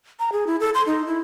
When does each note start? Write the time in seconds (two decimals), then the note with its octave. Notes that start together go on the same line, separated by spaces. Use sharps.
0.20 A#5
0.32 G#4
0.47 E4
0.60 A4
0.74 C6
0.86 D#4
1.07 E4